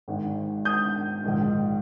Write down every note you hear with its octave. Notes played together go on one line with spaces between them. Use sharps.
G#1 G#2 D#3
D#6 G6
A#1 G#2 D#3